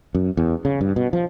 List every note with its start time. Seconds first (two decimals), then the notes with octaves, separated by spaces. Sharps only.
0.15 F#2
0.37 E2
0.65 C#3
0.81 G2
0.96 B2
1.13 F3